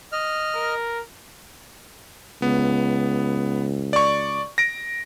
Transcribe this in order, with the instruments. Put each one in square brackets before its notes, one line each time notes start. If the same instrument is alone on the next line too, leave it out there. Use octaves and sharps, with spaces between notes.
[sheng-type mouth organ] D#5 F6
[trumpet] A#4
[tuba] C#2 [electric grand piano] B3
[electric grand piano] D5 C#6
A#6 D7